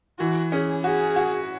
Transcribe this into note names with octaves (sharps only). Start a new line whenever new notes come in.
E3 F#4
C#4 G#4
F#4 G#4
F#4